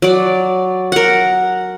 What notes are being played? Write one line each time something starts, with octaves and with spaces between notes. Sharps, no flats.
F#3 D5
A#4 F#5